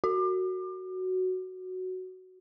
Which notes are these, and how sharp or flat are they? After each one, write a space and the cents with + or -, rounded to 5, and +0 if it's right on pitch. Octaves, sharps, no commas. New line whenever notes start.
F#4 +5